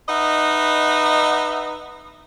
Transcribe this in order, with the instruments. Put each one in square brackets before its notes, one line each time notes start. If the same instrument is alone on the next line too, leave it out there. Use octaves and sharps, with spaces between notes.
[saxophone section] D#4 B4 D#5 E5 F#5